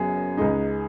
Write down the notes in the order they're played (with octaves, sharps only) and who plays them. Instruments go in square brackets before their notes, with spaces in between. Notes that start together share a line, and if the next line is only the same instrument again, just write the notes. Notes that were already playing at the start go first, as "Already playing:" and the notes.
Already playing: [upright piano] F#1 F#2 F#3 B3 [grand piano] G#4
[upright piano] C#2 C#3 G#3 D#4